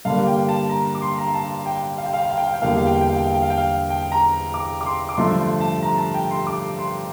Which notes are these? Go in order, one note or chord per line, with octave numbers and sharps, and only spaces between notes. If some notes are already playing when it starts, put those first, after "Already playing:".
G2 D3 G3 A#3 F5
G5
A5
A#5
D6
C6
A#5
A5
G5
F5
G5
F5
G5
F5
G5
F5
G5
E2 D3 G3 A#3 F5
G5
F5
G5
F5
G5
F5
G5
F5
G5
F5
G5
F5
G5
A#5
D6
D6
C6
D6
G2 D3 F3 A3 C6
C6
A5
A#5
A5
G5
C6
D6
C6